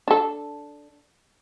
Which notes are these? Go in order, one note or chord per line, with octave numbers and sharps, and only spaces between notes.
D4 A4